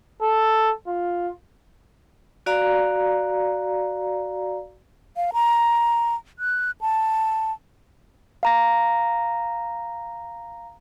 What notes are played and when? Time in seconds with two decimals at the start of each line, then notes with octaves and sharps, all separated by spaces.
0.22 A4
0.87 F4
2.46 F#4 D5 F5 A#5
5.17 F5
5.33 A#5
6.39 F#6
6.81 A5
8.43 F5 A#5 A#6